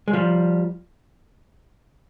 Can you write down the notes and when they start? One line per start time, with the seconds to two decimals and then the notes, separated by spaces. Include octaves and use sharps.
0.08 G#3
0.13 F3 G3